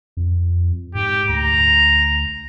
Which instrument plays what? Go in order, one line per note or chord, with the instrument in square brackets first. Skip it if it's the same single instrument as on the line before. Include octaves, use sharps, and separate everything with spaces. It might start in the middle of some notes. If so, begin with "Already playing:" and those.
[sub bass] F2
[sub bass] G#2 [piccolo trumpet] G4
[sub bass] D2 [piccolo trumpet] A#5